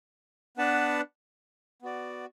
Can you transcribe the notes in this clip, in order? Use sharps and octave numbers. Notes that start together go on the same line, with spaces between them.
B3 D4 B4 F#5 A5
B3 F#4 D5